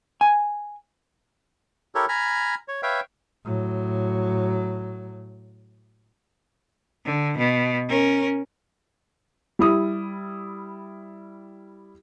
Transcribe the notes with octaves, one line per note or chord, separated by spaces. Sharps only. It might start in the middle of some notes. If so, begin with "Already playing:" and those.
G#5
E4 G4 A4 A#4 C#5
G#5 A#5 B5 F6
C#5
B4 C#5 E5 F5 G5
A2 F#3
D3
B2
C#4 A#4
G3 E4 D#6